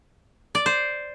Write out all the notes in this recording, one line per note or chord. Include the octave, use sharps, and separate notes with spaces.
D5
C5